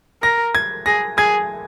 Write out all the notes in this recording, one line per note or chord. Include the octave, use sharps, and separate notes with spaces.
A#4 A#6
G#6
G#4 A#6
G#4 G#6